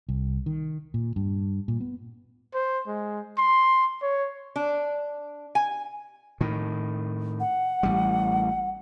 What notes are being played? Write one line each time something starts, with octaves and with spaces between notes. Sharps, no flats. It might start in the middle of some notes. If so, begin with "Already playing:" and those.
C2
D#3
A#2
G2
A#2
B3
C5
G#3
C6
C#5
D4
G#5
A2 D#3
F#5
A1 G3